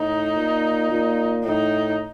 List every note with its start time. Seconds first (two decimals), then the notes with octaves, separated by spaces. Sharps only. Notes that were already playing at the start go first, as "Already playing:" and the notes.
Already playing: A2 D#4
0.36 A#2
0.91 A#2
1.44 A2 D#4